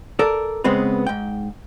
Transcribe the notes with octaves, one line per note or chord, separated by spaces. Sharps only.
A4 A#4 D5
C#3 G#3 B3 C4 B4
G#2 G5